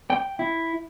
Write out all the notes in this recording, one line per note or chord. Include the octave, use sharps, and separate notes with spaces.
G5
E4